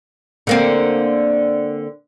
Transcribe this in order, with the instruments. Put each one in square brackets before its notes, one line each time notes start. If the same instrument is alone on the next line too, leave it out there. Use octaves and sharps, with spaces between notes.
[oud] D3 A#3 C4